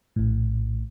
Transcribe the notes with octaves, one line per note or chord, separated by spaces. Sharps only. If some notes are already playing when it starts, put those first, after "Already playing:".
A#1 A2